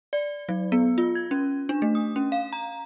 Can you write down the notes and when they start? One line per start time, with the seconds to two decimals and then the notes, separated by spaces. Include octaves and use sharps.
0.13 D5
0.49 F#3
0.72 B3
0.98 F4
1.15 G#6
1.31 C#4
1.69 D4
1.82 A3
1.95 D#6
2.16 C#4
2.32 F5
2.52 A#5